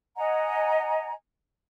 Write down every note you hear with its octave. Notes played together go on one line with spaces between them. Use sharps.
D#5 F#5 G#5 A#5